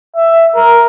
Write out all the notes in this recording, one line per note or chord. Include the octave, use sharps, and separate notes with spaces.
E5
A#4